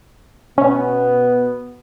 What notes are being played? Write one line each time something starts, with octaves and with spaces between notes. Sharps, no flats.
B2 B3 C#4